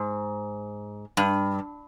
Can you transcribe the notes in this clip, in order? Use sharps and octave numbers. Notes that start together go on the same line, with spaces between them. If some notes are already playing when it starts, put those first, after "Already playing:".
Already playing: G#2
G2